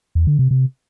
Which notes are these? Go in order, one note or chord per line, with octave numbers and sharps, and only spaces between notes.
E2
D3
C3
C3